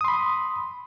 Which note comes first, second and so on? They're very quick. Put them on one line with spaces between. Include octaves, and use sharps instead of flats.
D#6 C6 B5